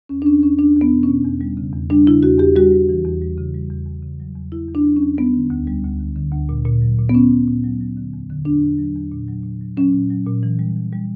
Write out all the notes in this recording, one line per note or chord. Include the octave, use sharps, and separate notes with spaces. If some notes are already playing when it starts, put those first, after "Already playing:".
E2 C#4
D4
E2 C#4
E2 C#4
E2 D4
E2
B3
B2
C#4
B2
E2
G3
C#3
E2
G3 D4
C#3 E4
E2 F#4
E2 G4
G3 F#4
G3
E3
E2
G3
C#3
G3
E2
E2
C#3
F#3
E2
E2 E4
E2
D4
F#3
C#4
E2
G3 B3
D3
D2
G3
D2
D3
D3
D2
A#2
A#2
F#3
A#2
B3
A#2 C#4
A#2
A#2
F#3
F#3
D3
E2
D3
E2 D4
E2
F#3
E2
A#2
F#3
A#2
F#3
F#3 C#4
A#2
F#3
A#2
E3
G3
E3
G3